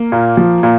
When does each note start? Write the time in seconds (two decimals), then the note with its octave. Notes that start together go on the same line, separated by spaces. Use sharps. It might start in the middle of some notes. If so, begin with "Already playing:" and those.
Already playing: A#3
0.12 A#2
0.37 F3
0.63 A#2